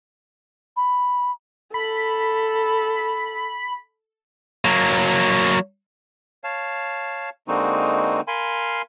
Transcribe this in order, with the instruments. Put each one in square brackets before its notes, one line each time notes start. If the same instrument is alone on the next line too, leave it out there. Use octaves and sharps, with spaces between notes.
[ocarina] B5
[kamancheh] A4 [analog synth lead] B5
[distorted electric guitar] F#3 A#3
[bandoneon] C#5 F5 A5
D3 G#3 A#3 C4 D#4 F#4
A#4 F5 G#5 B5 C6